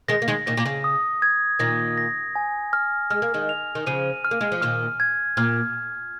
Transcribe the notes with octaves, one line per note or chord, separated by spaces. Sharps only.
D#3 G#3 A#6
A#3
D#3 G#3
A#2 D#3 A#6
A#2
C#3
D#6
G#6
A#2 D#3 A#6
A#6
G#5
F6
G#3 F6
A#3
D#3 G#3
F7
D#3
C#3 F3 D#7
F6
A#3
G#3
F3
A#2 D#3 F6
G#6
A#2 F6